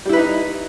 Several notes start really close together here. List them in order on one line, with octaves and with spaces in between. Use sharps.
G3 E4 B4 D#4